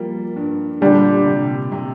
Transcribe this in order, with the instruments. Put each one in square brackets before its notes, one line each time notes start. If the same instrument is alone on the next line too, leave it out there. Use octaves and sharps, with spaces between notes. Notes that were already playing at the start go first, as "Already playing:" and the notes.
Already playing: [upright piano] F3 G3 A#3
G2
[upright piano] A#2 [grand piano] D3 G3 D4
[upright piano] C3
C3